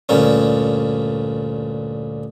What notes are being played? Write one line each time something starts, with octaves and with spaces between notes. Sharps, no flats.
D2 G2 A#2 C#4